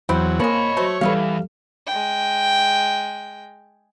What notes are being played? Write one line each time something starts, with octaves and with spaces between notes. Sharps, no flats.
E2 F#3 C4 E4 C5
F3 G#3 A#3 C#5 D#5 B5
F#3 A3 C5
E2 G3 A4 B4 E5 F5
G#3 G5